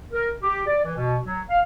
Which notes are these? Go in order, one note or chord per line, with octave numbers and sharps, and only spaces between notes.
A#4
G4
D5
E3
B2
F#3
F5